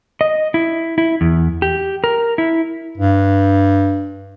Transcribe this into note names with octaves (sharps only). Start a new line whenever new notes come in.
D#5
E4
E4
E2
G4
A#4
E4
G2